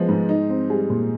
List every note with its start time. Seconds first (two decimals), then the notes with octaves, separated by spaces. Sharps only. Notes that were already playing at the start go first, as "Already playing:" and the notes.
Already playing: F3 G#3 B3
0.08 G#2
0.29 D#4
0.50 C4
0.70 G3 G#4
0.90 A#2